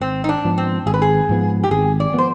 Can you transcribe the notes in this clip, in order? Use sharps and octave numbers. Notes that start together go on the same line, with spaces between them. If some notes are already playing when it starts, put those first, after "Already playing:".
G#1 C4
D#4
D4
G#2 F3 B3
C4
G#1 G#4
B4
G#4
G#2 F3 B3
G4
G#1 G#4
D5
F3 B3 C5